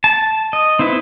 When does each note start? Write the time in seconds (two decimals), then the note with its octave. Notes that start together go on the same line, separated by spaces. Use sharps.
0.04 A5
0.53 D#5
0.79 C4 D#4 E4 B4